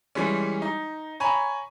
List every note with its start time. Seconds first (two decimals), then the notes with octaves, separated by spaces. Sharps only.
0.15 E3 G3 G#3 C#4
0.62 D#4
1.20 C#5 G#5 A#5 B5